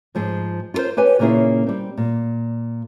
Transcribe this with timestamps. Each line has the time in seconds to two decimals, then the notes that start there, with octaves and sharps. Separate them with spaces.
0.15 G#2 F3 G#4
0.74 F4 F#4 A4 A#4 C5
0.97 G4 B4 C#5 G#5
1.19 A#2 C#3 A#3 C#4 E4 G#4
1.67 G3 C4
1.97 A#2